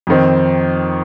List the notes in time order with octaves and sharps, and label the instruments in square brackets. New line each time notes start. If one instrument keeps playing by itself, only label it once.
[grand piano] F2 D#3 C4